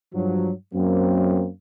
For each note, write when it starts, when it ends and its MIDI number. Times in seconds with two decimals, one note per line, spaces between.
0.14 0.51 43
0.14 0.51 53
0.14 0.51 54
0.74 1.48 42
0.74 1.48 54
0.74 1.48 58
0.74 1.48 60